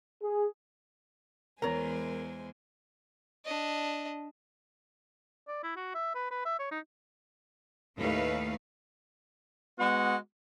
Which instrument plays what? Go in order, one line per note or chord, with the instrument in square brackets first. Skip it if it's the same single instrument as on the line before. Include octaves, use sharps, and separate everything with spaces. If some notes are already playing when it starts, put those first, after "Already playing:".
[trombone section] G#4
[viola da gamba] E2 [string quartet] G#3 C5 G#5 [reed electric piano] A#4 [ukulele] C#5 A#5
[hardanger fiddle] D4 D#5
[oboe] D5
E4
F#4
E5
B4
B4
E5
C#5
D#4
[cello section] D#2 A2 A3 D#4 B4 F5
[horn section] G#3 B3 F#4 F#5